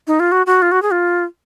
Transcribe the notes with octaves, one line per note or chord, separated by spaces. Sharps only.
D#4
F4
F#4
F#4
F4
F#4
G#4
F4